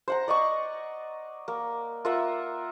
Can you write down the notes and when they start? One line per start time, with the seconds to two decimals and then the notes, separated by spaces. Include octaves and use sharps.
0.08 C5 F#5 A#5
0.28 D5 D#5 F#5 C#6
1.48 A#3
2.05 F4 A#4 E5 F#5